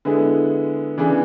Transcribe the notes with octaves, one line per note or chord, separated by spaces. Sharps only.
D3 G#3 B3 E4 G#4
C#3 E3 B3 D4 G#4